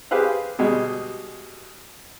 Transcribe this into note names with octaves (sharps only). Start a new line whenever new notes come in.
G4 G#4 B4 C5 F5
B2 G3 G#3